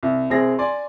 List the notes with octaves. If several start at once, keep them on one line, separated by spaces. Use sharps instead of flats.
C2
C2 C4 G#4 A#6
D5 G#5 C6